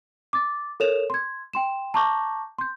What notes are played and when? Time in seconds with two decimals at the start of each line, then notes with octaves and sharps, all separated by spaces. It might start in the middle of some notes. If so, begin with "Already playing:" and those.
0.33 D6 A6
0.80 A4 A#4 C#5 E7 F7
1.10 C6 G#6
1.53 G5 C6 E7
1.94 A5 A#5 C#6 D6 G6 A#6
2.59 C6 G6